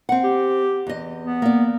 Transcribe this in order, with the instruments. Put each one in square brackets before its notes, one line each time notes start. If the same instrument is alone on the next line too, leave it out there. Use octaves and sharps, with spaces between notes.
[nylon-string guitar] C4 F#5
[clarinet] G4
[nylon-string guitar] E2 D#5
[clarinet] B3
[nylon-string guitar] A#3 D5